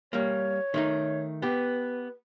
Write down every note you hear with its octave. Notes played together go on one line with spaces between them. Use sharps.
G3 A#3 C#5
D#3 A3 D#4
B3 G4 B4